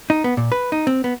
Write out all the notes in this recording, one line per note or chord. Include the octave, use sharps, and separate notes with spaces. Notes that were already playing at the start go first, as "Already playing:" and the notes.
D#4
B3
A#2
B4
D#4
C4
B3